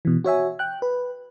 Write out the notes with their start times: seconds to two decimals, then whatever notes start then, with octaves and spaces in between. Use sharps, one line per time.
0.05 B2 E3
0.24 F#4 C#5 E5 G#5
0.59 G5 F#6
0.82 B4